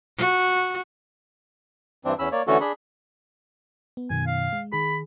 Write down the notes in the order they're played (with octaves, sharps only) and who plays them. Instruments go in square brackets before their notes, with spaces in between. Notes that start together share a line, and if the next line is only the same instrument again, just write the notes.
[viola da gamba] F#4
[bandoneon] G2 E3 C4 D4
E2 C#4 B5 E6
A#3 C#5 D5
D3 E3 A3 C#4 F#4 A4
D4 G#4 B5
[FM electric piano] B3
[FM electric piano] F#2 B2 D#3 [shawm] G#5
[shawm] F5
[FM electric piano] G#3
[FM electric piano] D#3 G#4 [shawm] B5